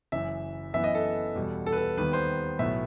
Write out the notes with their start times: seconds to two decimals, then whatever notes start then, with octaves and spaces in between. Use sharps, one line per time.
0.12 F#1 F#2 E3 E5
0.74 F#2 E3 B3 E5
0.84 D#5
0.95 A4
1.35 E2 B2 G3
1.66 A4
1.72 B4
1.78 A4
1.97 D#2 D#3 G3 B3 B4
2.13 C5
2.59 B1 A2 F#3 B3 E5